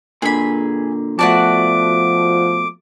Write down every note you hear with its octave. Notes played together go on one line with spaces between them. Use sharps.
A#2 D3 G#4 B5
B2 F3 A3 F#4 D5 A5 D6